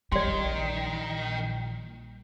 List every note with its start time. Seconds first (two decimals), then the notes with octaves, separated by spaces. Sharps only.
0.12 A#1 D#3 G3 D5 C6